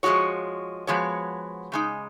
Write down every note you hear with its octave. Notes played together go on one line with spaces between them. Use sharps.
F3 G#3 B3 F#4 C#5
F3 G#3 B3 F#4 C#5
C#3 G#3 D#4